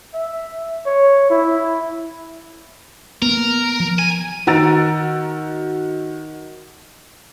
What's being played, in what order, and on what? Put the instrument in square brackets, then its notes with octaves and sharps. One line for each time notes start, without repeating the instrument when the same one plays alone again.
[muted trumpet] E5
C#5
E4
[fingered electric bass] A#3 B3 [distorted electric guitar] A#4
[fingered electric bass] F3
[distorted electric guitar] G#5
[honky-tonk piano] D#3 F#4 A#5 E6 A6 D7